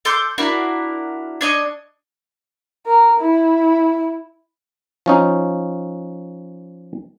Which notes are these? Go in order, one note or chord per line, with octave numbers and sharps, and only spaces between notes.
A4 C6 D6 G6
D4 E4 F#4 A#4
D4 C#5 D#5
A#4
E4
F3 C#4 D#4